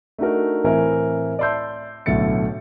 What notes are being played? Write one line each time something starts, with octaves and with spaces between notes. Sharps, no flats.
A3 D4 D#4 F#4 A#4
A2 E3 C4 E4 A#4 G#5
D5 E5 A5 C6 E6 G6
B1 A2 D3 A3 A6 C#7